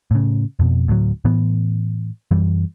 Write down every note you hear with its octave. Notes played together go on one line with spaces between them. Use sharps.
A2 C#3
F2 B2
D2 A2 F#3
A2 E3 B3
F#2 E3 G3